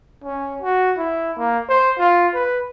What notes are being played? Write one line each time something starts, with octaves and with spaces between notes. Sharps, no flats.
C#4
F#4
E4
A#3
C5
F4
B4